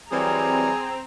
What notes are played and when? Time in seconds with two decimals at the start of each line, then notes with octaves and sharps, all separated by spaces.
0.11 E3 F#3 G3 C4 G#4 A#5